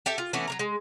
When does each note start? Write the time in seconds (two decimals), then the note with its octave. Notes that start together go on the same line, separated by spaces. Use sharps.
0.06 G4 A4 E5
0.18 F4
0.33 E3 A3 B3 C#4
0.48 F#3 A#3 A#5
0.59 G#3